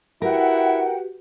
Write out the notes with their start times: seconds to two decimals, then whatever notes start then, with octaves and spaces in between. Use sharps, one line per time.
0.22 E4 F#4 G4 A#4 B4 F#5 G5